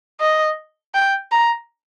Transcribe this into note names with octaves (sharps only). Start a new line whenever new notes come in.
D#5
G5
A#5